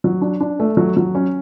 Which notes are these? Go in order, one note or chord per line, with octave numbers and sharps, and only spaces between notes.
F#3
D4
D4
A3
F#3
F#3
C#4